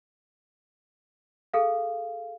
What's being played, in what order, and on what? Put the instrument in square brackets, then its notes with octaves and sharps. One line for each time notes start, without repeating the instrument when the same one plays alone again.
[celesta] G#4 A4 F5